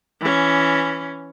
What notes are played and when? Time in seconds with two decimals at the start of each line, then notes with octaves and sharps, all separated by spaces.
0.21 E3 C#4